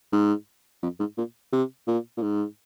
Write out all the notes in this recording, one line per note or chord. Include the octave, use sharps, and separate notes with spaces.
G#2
F2
G#2
A#2
C3
A#2
A#2
G#2